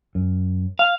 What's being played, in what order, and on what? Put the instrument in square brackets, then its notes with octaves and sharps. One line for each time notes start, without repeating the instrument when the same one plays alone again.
[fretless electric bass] F#2
[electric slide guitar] F5